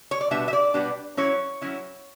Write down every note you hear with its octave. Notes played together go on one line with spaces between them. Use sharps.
C#5
D5
B2 G3 B3 D4 E5
E5
D5
B2 G3 B3 D4
F#3 C#4 E4 C#5
F#3 C#4 E4